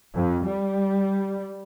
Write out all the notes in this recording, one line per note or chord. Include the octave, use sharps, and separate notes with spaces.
F2
G3